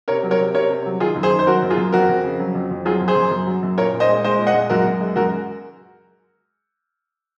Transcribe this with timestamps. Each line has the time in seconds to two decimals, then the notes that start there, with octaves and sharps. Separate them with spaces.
0.08 C3 A#4 C#5
0.23 F#3
0.31 A#4 C#5
0.38 C3
0.55 C3 A#4 C#5
0.70 C3
0.86 F#3
1.00 D#3 F4 G#4
1.16 F#2
1.23 G#4 C5
1.32 D#3
1.39 C5
1.47 F#3 F#4 A#4
1.62 F#2
1.70 F4 G#4
1.77 F#2
1.92 F2 F#4 A#4
2.09 F2
2.24 C#3
2.40 F#3
2.55 F2
2.71 F2
2.85 F#3 F4 G#4
3.00 F#2
3.08 G#4 C5
3.16 F#2
3.31 F#2
3.47 F#3
3.63 F#2
3.78 A#2 A#4 C#5
3.92 A#2
4.00 C5 D#5
4.09 G#3
4.24 G#3 C5 D#5
4.39 A#2
4.47 D#5 F#5
4.54 G#3
4.70 F#2 F#4 A#4
4.85 F#2
5.01 G#3
5.16 F#2 F#4 A#4